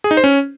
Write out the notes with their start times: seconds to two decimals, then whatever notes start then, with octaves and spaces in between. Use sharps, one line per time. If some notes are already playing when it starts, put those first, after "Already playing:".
0.04 G#4
0.11 D#4
0.17 C5
0.24 C#4